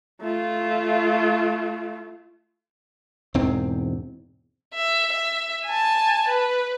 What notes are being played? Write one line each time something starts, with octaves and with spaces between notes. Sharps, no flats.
A3 F4
E1 E2 G#2 C4
E5
E5
G#5 A5
B4